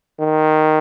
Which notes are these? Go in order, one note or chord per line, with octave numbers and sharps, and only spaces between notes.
D#3